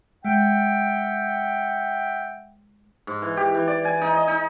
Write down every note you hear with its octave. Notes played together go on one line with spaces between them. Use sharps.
G#3 E5 F#5 G5
G#2
E3
G4
E3
D5
G#5
D#4
D#5
D#4